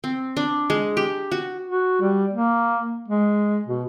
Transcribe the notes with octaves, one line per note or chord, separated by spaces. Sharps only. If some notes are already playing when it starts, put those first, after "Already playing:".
C4
D4
G#3
G4
F#4
F#4
G3
A#3
G#3
B2